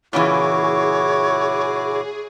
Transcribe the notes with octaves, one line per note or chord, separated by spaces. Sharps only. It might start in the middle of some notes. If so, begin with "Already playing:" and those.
A#2 C#3 E3 E4 F#4 G#4 C#5 D6